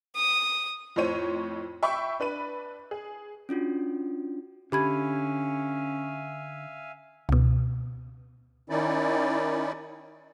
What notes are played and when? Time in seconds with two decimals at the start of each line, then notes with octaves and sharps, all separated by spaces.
0.16 D#6
0.96 F2 A2 C5 C#5 D#7
1.83 E5 G5 B5 C#6
2.20 D4 B4 B5 D#7
2.91 G#4
3.49 C#4 D4 F4 F#4
4.72 D3 C#4 G4 E5 F5 G#5 B5 G#6
7.29 C#2 B2
8.70 D#3 C#4 D#4 E4 D5